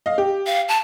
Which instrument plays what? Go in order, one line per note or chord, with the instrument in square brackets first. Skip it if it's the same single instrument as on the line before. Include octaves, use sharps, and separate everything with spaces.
[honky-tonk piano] D#5 F5
G4
[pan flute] F5
A5